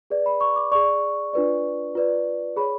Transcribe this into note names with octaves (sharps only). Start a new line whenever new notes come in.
G#4 B4 D5
B5
C#6
D6
G#4 D5 C#6
D4 F4 B4 D5
F4 B4 D5
G#4 C#5 B5